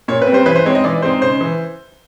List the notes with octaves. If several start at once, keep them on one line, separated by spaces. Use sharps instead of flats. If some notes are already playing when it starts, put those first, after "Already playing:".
A#2 C#5
B4
C4
G3 C5
E3 B4
C5
G#3 C4 D#4 C#5
D#5
E3 D5
G#3 C4 D#4 C5
C#3 C5
E3